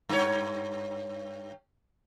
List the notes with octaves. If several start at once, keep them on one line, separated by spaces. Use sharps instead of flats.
G2 C#5